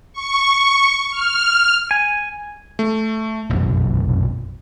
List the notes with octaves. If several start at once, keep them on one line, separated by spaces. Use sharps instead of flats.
C#6
F6
G#5
A3
F1 A#1 F#2 B2